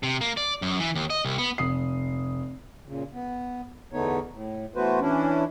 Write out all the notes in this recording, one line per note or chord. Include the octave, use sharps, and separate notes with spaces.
C3
A#3
D5
F#2
E3
D#2
D#5
C2
B3
F1 D#6 C7
A#2 C#3
B3
E2 D3 A3 B3 D#4 C#5
A2
E3 A3 B3 F#4 B4 C5
E3 C#4 D4 E4